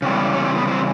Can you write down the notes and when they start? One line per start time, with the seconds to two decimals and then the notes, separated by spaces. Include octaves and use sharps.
0.02 C#3 E3 G3 C4
0.13 B3
0.34 C#4
0.45 C4
0.56 B3
0.67 C4